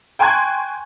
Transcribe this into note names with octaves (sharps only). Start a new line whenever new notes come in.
G5 G#5 C6 C#6 F#6 G#6